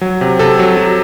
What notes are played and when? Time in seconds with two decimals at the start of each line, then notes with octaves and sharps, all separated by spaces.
0.01 F#3
0.21 C3
0.39 C3 A4
0.59 F#3
0.77 F#3